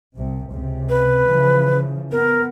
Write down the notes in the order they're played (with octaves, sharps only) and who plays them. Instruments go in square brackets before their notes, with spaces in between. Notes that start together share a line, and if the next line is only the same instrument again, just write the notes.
[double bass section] C2 C3
C#2 C3
[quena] B4
[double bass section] C#3 E3 F3
[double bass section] B3 [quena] A#4